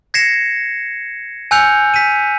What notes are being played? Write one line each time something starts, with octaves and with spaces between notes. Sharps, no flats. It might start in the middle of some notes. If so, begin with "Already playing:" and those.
G#6 A#6 C7 C#7 E7
G#5 E6 F#6 G6 C#7 F7
B6 D#7